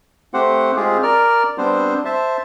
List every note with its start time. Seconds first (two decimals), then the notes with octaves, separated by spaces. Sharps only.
0.34 A3 C4 G4 C5 F#5
0.76 G#3 C4 F4 G4 G#4
1.03 A#4 D5 F6
1.58 G3 B3 C4 D4 C5
2.05 C5 E5 A5